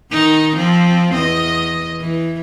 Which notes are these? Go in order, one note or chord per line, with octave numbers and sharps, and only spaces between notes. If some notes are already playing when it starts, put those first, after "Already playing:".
D#3 D#4
F3 C4
E2 D#5
E3